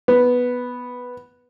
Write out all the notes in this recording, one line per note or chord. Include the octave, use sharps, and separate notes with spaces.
B3